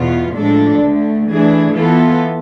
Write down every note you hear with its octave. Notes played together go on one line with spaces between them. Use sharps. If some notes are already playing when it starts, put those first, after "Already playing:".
Already playing: E2 B2 B3 F4
A2 F3 G#3 D4 A4
D2 D3 A3
E3 A3 D4 G#4
E3 B3 F4 A4